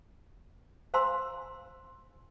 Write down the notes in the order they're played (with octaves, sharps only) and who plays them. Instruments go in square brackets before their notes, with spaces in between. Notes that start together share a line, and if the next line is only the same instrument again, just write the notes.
[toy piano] C5 F5 G#5 A#5 C6 E6